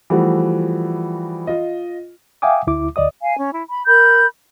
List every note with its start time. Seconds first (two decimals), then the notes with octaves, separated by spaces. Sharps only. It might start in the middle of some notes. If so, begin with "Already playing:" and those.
0.10 E3 F3 G3 A3 F#4
1.47 F4 D#5
2.42 E5 F5 G5 G#5 D6 D#6
2.67 D2 E4 D6
2.96 D2 D5 D#5 D#6
3.20 F5 G#5
3.38 C#4
3.53 E4
3.69 B5
3.86 A#4 B5 G6